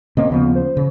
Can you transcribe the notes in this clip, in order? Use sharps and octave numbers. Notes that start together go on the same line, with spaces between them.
C3 A#3 C#4 D#5
D#2 C#3 F3 B3
C5
C#3